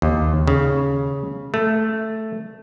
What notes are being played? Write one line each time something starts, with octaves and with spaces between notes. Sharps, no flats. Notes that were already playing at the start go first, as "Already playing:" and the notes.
D#2
C#3
A3